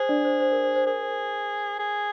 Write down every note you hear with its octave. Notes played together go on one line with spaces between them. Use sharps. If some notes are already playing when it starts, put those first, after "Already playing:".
Already playing: G#4 C5
D4 D5
C5
C5
A#4
C5
C5
G#4 A#4
C5
A#4
G#4